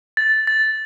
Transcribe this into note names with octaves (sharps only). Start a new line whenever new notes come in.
A6
A6